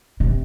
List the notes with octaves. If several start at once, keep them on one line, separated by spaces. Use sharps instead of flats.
C3